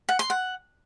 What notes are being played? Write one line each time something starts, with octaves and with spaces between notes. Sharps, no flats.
F#5
C6
F#5